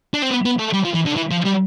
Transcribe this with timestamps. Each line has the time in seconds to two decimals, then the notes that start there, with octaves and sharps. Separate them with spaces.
0.14 D4
0.22 C4
0.31 B3
0.45 B3
0.59 A3
0.74 G3
0.85 F3
0.95 E3
1.06 D3
1.17 E3
1.31 F3
1.45 G3